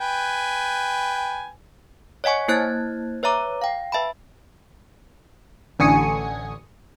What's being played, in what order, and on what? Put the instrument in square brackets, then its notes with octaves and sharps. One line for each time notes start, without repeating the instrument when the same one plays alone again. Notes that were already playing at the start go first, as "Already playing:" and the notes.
[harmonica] B4 G5 G#5
[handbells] C#5 D#5 F#5 G#5 C#6
A#3 E4 C5 F#6 G#6 A6
B4 C#5 E5 A#5 D6
F5 G5
B4 E5 A5 B5
[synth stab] A1 D3 G#5 C#6 D#6 C#7